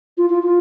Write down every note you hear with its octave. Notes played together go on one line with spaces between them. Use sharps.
F4
F4
F4